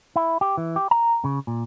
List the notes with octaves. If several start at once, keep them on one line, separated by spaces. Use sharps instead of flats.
E4
G4
E3
G4
A#5
C#3
A#2